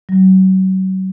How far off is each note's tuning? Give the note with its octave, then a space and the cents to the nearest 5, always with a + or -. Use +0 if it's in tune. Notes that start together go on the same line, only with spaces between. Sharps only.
F#3 +35